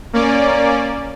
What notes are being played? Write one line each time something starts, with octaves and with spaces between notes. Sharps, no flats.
A#3 C#4 D5